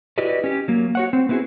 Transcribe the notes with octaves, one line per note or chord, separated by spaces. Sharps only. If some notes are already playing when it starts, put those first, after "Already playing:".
E4 F#4 G4 B4 D5 D#5
C#4 G4
F#3 A#3
F#4 C#5 F#5
C4
B3 C4 E4 F#4 G#4